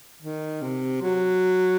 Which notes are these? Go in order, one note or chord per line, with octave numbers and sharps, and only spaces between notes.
D#3
C3
F#3